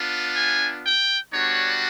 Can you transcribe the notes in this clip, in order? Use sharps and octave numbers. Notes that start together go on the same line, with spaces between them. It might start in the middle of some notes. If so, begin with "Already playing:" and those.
Already playing: B3 D4 F4
G#5
G5
G3 B3 D4 F#4 C#5